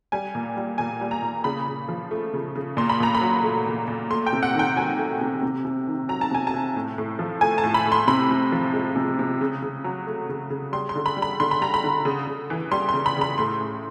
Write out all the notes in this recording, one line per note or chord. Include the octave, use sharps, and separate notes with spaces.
G3 G#5
A#2
G3
A#2 G#5
G3
A#5
A#2
C#3 B5
C#3
F3
A3
C#3
C#3
A#2 C6
B5
A#2 A#5
B5
F#3
A3
A#2
A#2
A3 C6
G5
C3
F#5
D#3 G5
F#3 G#5
A3
C3
C3
C3
D#3
F#3 A#5
A5
C3 G#5
A5
C3
A2
A2
F3
A3 G#5
A5
A2
B5
A2
C6
C3 B5
C3
F3
G#3
C3
C3
C#3
C#3
F#3
A3
C#3
C#3
G3 C6
C6
D3
B5
G3
B5
D3 C6
B5
G3 A#5
B5
D3
C#3
C#3
E3
G3 C6
C6
C#3
B5
C#3 B5
A2 C6
A2